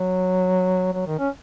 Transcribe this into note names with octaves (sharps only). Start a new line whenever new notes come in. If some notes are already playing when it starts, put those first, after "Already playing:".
Already playing: F#3
F#3
D#3
C#4